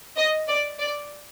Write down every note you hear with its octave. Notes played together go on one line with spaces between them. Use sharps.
D#5
D5
D5